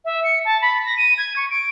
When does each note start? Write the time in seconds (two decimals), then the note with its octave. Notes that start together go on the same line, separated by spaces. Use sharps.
0.05 E5
0.24 C#7
0.45 A5
0.62 B5
0.85 A#6
0.97 D#7
1.18 G#6
1.36 C#6
1.50 D7